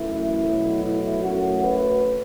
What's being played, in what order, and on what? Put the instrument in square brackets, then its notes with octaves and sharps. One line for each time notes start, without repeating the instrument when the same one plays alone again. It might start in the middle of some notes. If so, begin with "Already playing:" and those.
Already playing: [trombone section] F#2 E3 A3 E4
B2 F#3 A3
E4
F#2 F#3 A3 F#4
B4